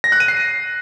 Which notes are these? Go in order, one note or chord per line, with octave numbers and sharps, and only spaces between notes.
A#6
F#6
D#7
C7